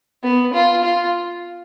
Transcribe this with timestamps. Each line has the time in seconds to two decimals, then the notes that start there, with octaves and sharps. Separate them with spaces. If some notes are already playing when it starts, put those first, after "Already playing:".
0.23 B3
0.53 F4
0.84 F4